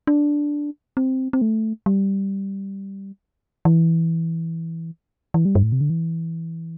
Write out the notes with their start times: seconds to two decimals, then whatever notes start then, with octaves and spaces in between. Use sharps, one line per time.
0.07 D4
0.97 C4
1.33 C4
1.42 A3
1.86 G3
3.65 E3
5.34 E3
5.45 G3
5.55 G2
5.63 A2
5.72 C3
5.81 D3
5.90 E3